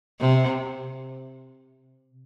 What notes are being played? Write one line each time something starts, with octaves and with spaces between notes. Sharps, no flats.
C3